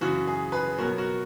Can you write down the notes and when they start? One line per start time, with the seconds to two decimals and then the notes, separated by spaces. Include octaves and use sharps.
0.01 F#2 C#3 E3 F#4
0.27 G#4
0.52 G#4 B4
0.78 B2 F#3 B3 F#4 A#4
0.97 F#4 A#4